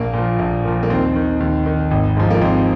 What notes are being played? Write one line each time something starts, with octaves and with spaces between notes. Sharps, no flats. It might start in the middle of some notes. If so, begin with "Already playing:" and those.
Already playing: A#1 A#3
A#2
F3
A#1
A#2 F3
A#3
D#2 C4
D#3
D#2
D#3
G#1
G#2 F3
A#3
G#1 C4